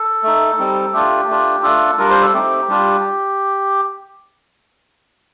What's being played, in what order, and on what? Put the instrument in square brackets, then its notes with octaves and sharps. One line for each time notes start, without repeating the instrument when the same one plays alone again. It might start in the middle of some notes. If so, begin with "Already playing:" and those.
Already playing: [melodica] A4
A3 D#4
G3 C4 D#4
A3 D4 F4 G4
A3 D4 F4
A3 D4 F4 A4
G3 D4 F4 A#4
C5
A4
A3 C4 D#4 G4
G3 D4 F4